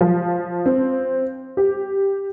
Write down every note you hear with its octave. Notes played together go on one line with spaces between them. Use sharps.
F3
C4
G4